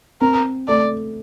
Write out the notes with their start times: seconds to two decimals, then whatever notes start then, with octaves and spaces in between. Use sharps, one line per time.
0.21 C4 A#4
0.68 A3 D5